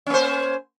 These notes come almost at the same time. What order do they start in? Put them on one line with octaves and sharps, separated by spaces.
C#4 A#3 C5